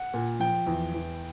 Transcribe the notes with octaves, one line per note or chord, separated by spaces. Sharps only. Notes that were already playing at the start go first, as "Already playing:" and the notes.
Already playing: F#5
A#2
F3 G5
E2
E2